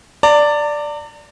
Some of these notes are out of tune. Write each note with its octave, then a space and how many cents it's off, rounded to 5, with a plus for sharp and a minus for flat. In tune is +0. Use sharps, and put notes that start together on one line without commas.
D5 +0 A#5 -45